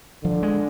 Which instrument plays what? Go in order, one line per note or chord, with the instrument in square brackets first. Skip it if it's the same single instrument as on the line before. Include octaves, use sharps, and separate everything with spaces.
[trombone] D3 [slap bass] F3
[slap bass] G#3